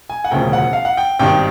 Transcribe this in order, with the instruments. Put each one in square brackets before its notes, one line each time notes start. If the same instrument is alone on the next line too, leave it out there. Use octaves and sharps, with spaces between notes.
[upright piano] G#5
F#5
E1 D2 C#3 F3 G5
F#5
F5
F#5
G5
G#1 G2 D#3 G5